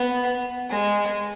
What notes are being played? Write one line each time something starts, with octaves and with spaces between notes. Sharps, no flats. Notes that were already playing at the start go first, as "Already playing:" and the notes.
Already playing: B3
G#3